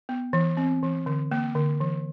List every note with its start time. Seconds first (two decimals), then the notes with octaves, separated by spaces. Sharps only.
0.09 B3
0.33 E3
0.57 C4
0.83 E3
1.06 D3
1.32 A#3
1.55 D3
1.80 E3